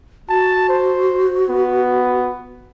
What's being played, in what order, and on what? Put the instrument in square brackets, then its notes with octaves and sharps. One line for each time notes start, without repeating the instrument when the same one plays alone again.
[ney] F#4 [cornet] A5
[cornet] C5
B3